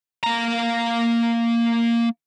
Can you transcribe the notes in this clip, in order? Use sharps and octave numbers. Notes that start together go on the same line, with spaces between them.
A#3 A#5